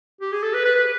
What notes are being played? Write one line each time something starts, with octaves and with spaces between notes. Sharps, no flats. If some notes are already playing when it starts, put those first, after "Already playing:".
G4
G#4
A4
B4
B4
B4